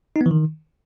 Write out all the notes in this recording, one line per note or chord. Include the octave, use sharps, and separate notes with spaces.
D#4
B3
E3
D#3